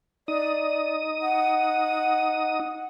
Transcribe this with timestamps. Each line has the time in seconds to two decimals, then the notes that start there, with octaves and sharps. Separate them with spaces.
0.28 D#4 D5 D#6
1.22 F#5